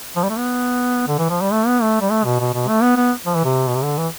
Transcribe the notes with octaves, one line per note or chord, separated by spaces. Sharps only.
F3
G3
A3
B3
D3
E3
F3
G3
A3
B3
A3
G3
A3
B2
B2
B2
A3
B3
B3
F3
E3
C3
B2
C3
D3
E3